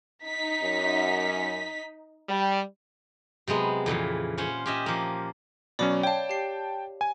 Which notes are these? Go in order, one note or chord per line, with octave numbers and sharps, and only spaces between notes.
D#4 B6
F#2
G3
C3 F#3 G#3 B3
F2 A#2 C#3 E3
C#4 F4 C5 F#5
C#4 G4 D#5 E5
F3 A#3
B2 F#3 C#4 D5 B5 D6
C#5 F5 G5 A5
G4 C7
G#5